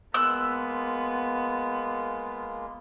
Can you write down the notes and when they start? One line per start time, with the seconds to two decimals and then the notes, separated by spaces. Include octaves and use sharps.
0.14 G#3 A#3 B3 F4 E6 F#6